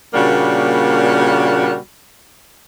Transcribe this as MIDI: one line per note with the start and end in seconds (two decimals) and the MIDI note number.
0.14 1.75 46
0.14 1.75 49
0.14 1.75 55
0.14 1.75 58
0.14 1.75 62
0.14 1.75 66